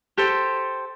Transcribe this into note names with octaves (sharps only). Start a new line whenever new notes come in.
G4 A4 C5